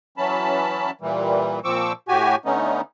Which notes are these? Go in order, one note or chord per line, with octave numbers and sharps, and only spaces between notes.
E3 F#3 C#4 A5 B5
A#2 E3 G3
A#2 F3 C4 C#6 D6 E6
A2 F#4 G4 G#5
D3 A3 B3 C#4 D#4